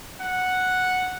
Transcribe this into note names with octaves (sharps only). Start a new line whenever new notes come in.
F#5